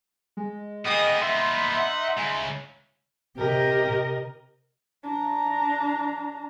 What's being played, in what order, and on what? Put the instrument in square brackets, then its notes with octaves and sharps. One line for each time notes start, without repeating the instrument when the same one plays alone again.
[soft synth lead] G#3
[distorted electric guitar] A#3 B3 [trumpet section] G#4 G5 D#6 [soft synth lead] D#5
[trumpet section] D#4 E5 [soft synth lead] C6
[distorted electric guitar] F#5
C#3 G#3
[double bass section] C3 [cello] G4 [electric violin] A#4 D#5
[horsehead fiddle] D4 A#5